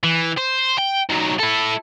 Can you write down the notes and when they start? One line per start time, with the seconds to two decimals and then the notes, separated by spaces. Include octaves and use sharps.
0.04 E3
0.37 C5
0.78 G5
1.10 D#3 F#3
1.39 E4 A4